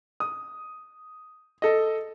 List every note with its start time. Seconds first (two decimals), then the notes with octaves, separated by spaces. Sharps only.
0.20 D#6
1.62 A4 D#5